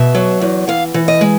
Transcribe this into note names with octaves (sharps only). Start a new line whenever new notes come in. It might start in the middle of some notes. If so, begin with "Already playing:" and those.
Already playing: B2 E5
F#3
E2
E3 F5
E3
D#5
G#3